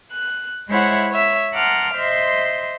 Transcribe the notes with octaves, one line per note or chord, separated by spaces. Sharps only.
F#6
G#3 E4 C5 C#5 E5 F#5
C#5 E5
F#5 A5 A#5 C6 D6 F6
C5 D#5 E5 C6